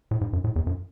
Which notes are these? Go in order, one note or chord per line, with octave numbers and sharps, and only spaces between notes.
A2
G#2
F#2
A2
E2
F#2